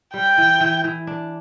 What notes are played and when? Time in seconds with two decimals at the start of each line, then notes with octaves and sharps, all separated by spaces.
0.14 G3 G5
0.38 E3
0.60 E3
0.84 E3
1.07 D4